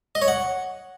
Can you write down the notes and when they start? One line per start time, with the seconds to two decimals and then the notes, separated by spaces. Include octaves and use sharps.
0.15 D#5
0.22 C#5
0.28 F#5